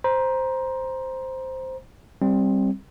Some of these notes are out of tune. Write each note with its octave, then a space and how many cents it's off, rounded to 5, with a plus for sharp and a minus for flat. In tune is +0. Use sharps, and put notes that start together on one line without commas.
C5 +0 A#5 +25
G3 +0 C4 +15